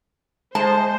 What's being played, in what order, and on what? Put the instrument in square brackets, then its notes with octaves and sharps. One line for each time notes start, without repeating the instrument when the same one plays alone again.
[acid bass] G#3 [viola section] C5 [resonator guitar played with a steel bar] A5